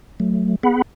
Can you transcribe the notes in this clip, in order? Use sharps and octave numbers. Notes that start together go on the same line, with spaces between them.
F#3 A3
B3 G#4 F#5 B5